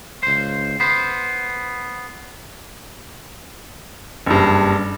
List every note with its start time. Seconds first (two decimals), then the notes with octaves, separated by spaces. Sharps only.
0.23 C#2 C5
0.80 B3 C5
4.26 F#1 G2